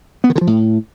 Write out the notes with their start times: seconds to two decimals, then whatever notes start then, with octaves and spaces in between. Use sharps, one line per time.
0.24 B3
0.30 D#3
0.36 D3
0.41 F3
0.47 A2